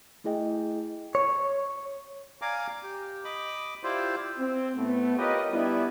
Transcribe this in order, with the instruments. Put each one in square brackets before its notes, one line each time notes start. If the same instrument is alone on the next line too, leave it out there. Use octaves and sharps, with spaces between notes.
[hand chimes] A3 E4 G#4 D#5 G5
[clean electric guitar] C#5
[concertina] D5 F5 G#5 A#5 D6
G4
D#5 B5 D6
E4 F4 G4 C5 D5
[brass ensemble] C4
A2 A3 B3
F4 G4 A#4 B4 C#5 D#5
G3 B3 D4 E4